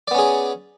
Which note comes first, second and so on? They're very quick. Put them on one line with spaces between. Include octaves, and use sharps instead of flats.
D5 B3 C#4 G#4